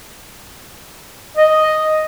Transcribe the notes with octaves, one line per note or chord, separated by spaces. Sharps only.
D#5